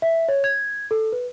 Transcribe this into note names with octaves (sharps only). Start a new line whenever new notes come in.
E5
C#5
G#6
A4
B4